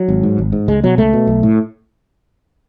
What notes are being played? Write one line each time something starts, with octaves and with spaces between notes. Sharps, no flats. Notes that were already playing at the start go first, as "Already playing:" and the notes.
Already playing: F#3
G#1
G#2
G#1
G#2
C#2 G#3
B2 F#3
C#2 A3
B2
B1
A2